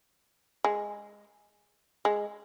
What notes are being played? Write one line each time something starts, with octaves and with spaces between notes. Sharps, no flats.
G#3
G#3